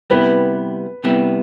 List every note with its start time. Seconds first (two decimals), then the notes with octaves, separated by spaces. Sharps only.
0.10 C3 G3 B3 E4 B4
1.04 C3 G3 B3 E4